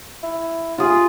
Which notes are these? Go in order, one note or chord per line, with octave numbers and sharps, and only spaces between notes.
E4
F4 G#4